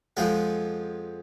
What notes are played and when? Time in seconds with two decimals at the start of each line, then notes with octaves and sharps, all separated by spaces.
0.17 F2 F3 G#3 B3